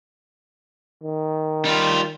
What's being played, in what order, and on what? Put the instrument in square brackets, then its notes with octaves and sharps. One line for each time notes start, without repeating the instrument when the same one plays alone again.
[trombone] D#3
[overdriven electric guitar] G3 F4